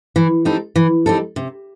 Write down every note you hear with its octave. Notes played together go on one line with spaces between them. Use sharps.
E3
G3 C4 D#4 A4
E3
G3 C4 D#4 A4
C3